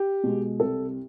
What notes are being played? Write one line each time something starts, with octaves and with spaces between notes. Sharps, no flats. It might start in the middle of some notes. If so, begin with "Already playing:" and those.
Already playing: G4
B2 G#3
C2 A4